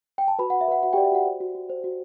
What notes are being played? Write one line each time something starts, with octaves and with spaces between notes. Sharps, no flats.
G5
A5
F#4 B4 B5
F#5
F#4
E5
B4 F#5
F#4 F#5
G4 G5
D5
E5
F#4 F#5
C5
F#4
F#4
C5
F#4